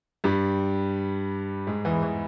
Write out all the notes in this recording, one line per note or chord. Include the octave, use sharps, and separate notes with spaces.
G2 G3
G#2 G#3
E2 E3
E3